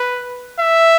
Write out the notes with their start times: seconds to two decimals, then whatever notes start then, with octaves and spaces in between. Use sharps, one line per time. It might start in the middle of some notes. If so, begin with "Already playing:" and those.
Already playing: B4
0.59 E5